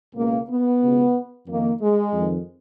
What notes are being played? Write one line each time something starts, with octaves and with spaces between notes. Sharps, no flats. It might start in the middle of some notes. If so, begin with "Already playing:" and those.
C#2 B2 A#3
B3
C#2 B2
F2 D#3 A#3
G#3
F2 D#3